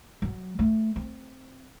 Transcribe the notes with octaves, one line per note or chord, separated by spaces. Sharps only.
F#3
A3
C4